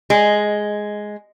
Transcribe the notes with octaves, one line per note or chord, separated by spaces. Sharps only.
G#3